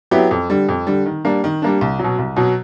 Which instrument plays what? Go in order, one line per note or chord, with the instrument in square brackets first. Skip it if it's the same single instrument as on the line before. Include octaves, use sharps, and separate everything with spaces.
[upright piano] F#3 B3 E4 G4
F2
D3 G3
F2
D3 G3
D#3
G3 A#3 D4
D#3
G3 A#3 D4
C2
B2 F#3
C2
B2 F#3